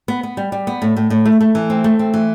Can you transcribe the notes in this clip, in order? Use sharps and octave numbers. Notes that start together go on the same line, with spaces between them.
B3
B3
G3
G3
B3
A2
A2
A2
A3
A3
E3
C4
A3
C4
E3